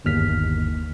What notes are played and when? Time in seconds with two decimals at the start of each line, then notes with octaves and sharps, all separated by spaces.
0.05 G1 D#2 F6 B6